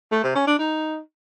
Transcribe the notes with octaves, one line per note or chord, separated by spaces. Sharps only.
A3
C3
C#4
D4
D#4